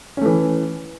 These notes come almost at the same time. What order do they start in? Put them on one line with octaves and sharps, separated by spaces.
C#4 A3 E3